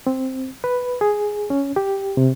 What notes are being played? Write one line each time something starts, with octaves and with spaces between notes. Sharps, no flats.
C4
B4
G#4
C#4
G4
C3